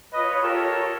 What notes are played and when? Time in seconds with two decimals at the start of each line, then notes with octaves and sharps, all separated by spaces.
0.13 F4 B4 C#5 D#5
0.43 G4 A4 A#4